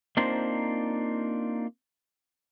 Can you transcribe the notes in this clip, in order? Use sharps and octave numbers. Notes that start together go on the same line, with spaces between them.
A#3 C4 D4 D#4 F4 C5